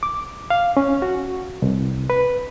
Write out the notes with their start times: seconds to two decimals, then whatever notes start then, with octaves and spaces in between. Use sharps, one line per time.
0.03 D6
0.50 F5
0.77 C#4
1.02 F#4
1.62 C2
2.10 B4